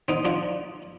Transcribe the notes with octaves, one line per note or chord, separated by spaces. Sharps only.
C4 D#4
D4 F4